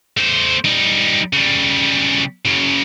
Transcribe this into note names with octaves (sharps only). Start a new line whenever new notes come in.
A3 C5
G3 D#4
C#3 G3
F#2 C#3